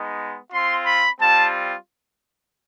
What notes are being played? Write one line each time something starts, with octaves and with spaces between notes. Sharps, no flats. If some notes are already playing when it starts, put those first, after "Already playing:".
Already playing: G#3 B3 D#4
C4 F4 C6
B5
G3 C4 F4 A5